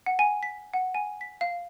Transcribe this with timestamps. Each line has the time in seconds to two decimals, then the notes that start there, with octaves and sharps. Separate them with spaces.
0.06 F#5
0.19 G#5
0.43 B6
0.74 F#5
0.95 G#5
1.21 B6
1.41 F5